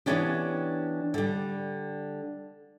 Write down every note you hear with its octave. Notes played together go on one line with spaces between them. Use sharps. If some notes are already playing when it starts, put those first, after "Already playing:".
E3 G3 B3 C#4 D4 G4
D3 G3